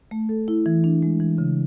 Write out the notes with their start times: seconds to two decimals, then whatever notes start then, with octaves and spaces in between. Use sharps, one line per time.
0.11 A3
0.29 A4
0.48 E4
0.66 E3
0.84 D4
1.03 G#3
1.20 E3
1.38 C#3